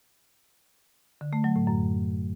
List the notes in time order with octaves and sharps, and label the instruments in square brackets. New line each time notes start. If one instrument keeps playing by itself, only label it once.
[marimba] D3
A3
F#3
A2
F#2